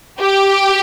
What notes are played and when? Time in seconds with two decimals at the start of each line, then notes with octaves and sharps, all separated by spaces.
0.20 G4